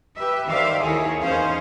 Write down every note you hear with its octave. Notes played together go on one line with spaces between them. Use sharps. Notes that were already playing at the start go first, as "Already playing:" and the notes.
G4 B4 E5
D#3 G4 C5 D5 E5 F5
D#2 D#3 E4 G#4 A4 C#5
E2 D#3 C#4 G#4 C5 F5